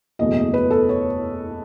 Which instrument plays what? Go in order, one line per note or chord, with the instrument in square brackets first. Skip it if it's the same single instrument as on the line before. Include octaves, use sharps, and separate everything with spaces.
[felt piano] F#1 E2 B2 A3 D#5
D#5
B4
A4
C#5